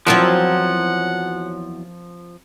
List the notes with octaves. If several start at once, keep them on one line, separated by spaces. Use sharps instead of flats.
E2 F3 F#3 C4 F4 A#4 F#5